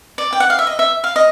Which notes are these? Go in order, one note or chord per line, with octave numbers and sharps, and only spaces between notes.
D5
G5
F#5
F5
E5
D#5
E5
F5
D#5